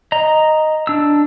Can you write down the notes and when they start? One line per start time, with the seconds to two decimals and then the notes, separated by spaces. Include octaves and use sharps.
0.12 D#5 A#5
0.87 D4 E6